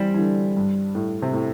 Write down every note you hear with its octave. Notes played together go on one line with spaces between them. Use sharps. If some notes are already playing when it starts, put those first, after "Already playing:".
Already playing: E3 G3 C4
E3
D3
G2
A2
C3
A2